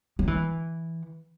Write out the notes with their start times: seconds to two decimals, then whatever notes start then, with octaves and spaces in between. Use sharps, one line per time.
0.19 F#3
0.27 E3